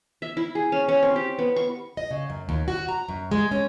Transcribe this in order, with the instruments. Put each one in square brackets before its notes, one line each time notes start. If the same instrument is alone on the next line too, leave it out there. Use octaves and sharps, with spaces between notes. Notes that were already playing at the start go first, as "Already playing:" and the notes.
[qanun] E5
E4
G#4
C#4
C#4
C4
G4
B3
C#6
[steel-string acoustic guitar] D#5
C#3
F#2
D#2
F#4
A#5
F#2
G#3
C#4